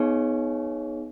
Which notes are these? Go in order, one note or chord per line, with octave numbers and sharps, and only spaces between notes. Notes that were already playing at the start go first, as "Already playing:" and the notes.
Already playing: B3 D#4 G#4 C#5